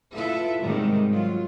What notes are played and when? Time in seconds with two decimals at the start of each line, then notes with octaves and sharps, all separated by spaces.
0.13 E4 F4 A4 B4 E5
0.61 G#2 C3 D#3 G3 G#3
1.10 F#3 F4